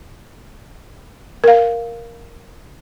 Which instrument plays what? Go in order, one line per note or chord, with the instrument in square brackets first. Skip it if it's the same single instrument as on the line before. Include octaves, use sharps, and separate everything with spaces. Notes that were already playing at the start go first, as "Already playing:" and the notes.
[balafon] A#4 F5